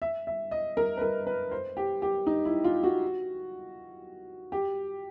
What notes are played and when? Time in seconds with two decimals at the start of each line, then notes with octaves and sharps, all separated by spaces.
0.02 E5
0.27 E5
0.51 D#5
0.77 A#4
0.97 B4
1.01 A#4
1.27 B4
1.52 C5
1.77 G4
2.02 G4
2.27 D#4
2.45 E4
2.64 F4
2.83 F#4
4.52 G4